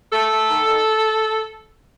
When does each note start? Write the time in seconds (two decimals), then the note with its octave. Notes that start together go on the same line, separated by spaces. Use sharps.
0.13 A3 A4
0.31 A3
0.49 D#3
0.66 D#3